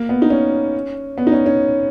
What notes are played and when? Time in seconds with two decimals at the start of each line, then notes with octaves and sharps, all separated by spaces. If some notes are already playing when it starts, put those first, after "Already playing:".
Already playing: A#3
0.09 B3
0.22 D#4
0.30 C#4
1.18 B3
1.27 D#4
1.32 C#4
1.46 C#4